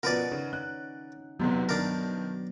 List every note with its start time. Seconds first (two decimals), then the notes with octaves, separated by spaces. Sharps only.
0.03 B2 F3 C#4 A#4 B4 D5 F#5
0.32 C#3 D#4
0.53 C#4 F#6
1.40 E2 G#2 C3 F#3 B3
1.69 G2 D#3 D4 A#4